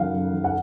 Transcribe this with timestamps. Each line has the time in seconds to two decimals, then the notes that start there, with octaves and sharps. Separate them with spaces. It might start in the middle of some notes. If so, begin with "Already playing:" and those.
Already playing: F#2 D#3 F5 F#5
0.13 F#2
0.33 D#3
0.44 F#5